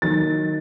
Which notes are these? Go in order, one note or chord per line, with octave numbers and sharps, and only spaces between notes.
D#3 F#3 A#3 D#4 A6